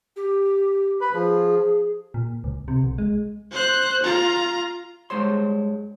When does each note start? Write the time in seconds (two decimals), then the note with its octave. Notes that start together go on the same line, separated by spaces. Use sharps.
0.16 G4
1.01 B4 B5
1.13 F3 G#4
2.14 A#2
2.44 C#2
2.68 C3
2.83 B1
2.98 G#3
3.51 C5 F#6
4.03 F4 A#5
5.10 G2 G#3 C5 C#5 C6